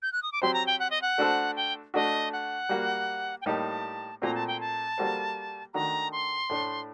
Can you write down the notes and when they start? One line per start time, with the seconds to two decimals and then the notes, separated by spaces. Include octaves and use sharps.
0.02 G6
0.12 F#6
0.23 D#6
0.32 D6
0.42 F#3 C4 G4 C5 C6
0.54 A#5
0.67 G5
0.80 F#5
0.90 D#5
1.02 F#5
1.18 A3 D4 F#4 A4 C5
1.56 G5
1.94 A3 D4 F#4 D#5
2.32 F#5
2.69 G3 A#3 F#4
3.41 G5
3.46 A2 G3 A#3 D#4 G4 A5
4.21 A#2 A3 C4 F#4 A#5
4.35 A5
4.48 G5
4.61 A5
4.98 G3 A#3 F#4 A4 C5
5.74 D#3 A3 D4 F#4 A#5
6.12 C6
6.49 A2 A3 D4